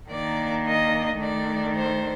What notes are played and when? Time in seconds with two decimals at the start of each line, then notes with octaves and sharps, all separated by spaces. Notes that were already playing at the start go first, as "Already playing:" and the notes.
0.10 D#3 A#3 D4 D5
0.66 D#5
1.20 D#3 A3 D4 D5
1.75 C5